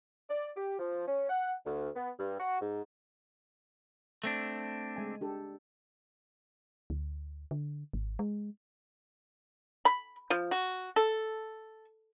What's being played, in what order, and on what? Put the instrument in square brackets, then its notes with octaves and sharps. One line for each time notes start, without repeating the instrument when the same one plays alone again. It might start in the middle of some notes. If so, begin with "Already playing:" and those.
[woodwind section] D5
G4
F3
C#4
F#5
D2
B3
G2
F#4
G#2
[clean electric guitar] A3 C4 D4
[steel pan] G#3 G#5
D4 G4 A4
[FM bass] D2
D3
G#1
G#3
[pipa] B5
F3
F#4
A4